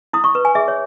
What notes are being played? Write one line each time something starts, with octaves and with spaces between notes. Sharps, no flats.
E4 D#6
C#6
B4
G#5
G#4 E5
C#5